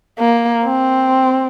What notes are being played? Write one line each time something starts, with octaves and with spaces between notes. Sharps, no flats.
A#3
C4